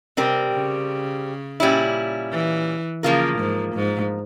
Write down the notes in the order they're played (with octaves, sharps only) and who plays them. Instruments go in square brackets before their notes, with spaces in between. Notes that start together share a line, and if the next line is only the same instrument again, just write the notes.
[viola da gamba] C3 [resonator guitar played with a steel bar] G3 C4 G4 A#4
[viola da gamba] C#3
[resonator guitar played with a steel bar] A#2 G3 C#4 E4
[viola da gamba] E3
[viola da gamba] C#3 [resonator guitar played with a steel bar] F3 A#3 F4 A#4
[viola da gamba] G#2
G#2